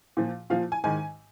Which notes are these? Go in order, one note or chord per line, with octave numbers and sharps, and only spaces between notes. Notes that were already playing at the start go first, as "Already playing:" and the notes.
A#2 F3
A#2 F3 F5
G#5
G#2 D#3 G#5